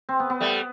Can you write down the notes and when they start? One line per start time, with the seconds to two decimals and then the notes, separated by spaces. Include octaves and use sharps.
0.09 C4
0.20 B3
0.30 B3
0.41 G3 A3